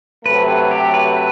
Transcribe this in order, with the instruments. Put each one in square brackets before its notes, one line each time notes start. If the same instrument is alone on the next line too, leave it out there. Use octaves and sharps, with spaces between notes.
[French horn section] C3 F#3 A3 [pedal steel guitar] B4
[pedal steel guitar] B4
G4
B4
B4